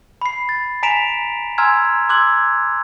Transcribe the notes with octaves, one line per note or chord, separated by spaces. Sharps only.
B5 C7
A6
G#5 A#5 B6 D7 E7 F7
G#5 A#5 C6 E6 F6 G#6
C6 D6 E6 F#6 G#6 F#7